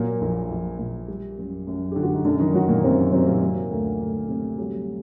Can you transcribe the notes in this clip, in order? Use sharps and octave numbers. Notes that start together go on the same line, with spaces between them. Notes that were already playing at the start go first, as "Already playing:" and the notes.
Already playing: A#2 F#3 A#3
A#1
A#1
A#2
G3
F#2
F#2
D3 G4
F#4
D#4
F#2 D3 D4
D#3 D#4
F#3 F#4
A#2 A#3
F#2 C3 C4
C3 F#3 C4
A#2 A#3
F#3
D2
D2
C3
F#3 G3